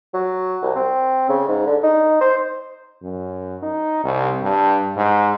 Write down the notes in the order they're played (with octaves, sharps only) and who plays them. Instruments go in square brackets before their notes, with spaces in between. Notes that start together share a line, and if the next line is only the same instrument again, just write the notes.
[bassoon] F#3
C2
C4
C#3
G#2
D3
D#4
C5
[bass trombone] F#2
D#4
C2
G2
G#2